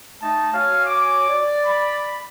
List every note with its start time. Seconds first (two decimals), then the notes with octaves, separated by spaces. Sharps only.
0.21 A3 D#4 A5
0.53 F#4 C#5 F5 G#5
0.85 D6
1.29 D5
1.65 B5